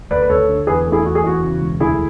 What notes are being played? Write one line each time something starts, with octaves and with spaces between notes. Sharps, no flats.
D2 B4 D5
B4
D2 A4 C#5
D3
E2 G#4 B4
A3
E4 G#4
E2 F#4
G#4
E2 F#4
C#3
E1
D2 E4 G#4